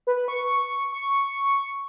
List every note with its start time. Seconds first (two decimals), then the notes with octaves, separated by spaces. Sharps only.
0.07 B4
0.28 C#6
0.92 C#6